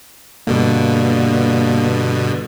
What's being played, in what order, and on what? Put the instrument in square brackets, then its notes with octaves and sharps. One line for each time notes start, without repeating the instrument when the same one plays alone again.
[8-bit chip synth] G2 B2 D3 [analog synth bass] A#3